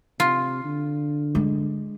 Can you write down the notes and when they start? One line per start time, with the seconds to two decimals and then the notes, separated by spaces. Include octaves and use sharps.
0.20 C3 F4
0.64 D3
1.35 G#3